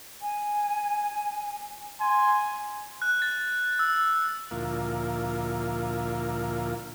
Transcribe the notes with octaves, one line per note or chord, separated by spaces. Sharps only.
G#5
G#5 C6
F#6
A6
E6
D2 A#2 F3 A#3 E4 F4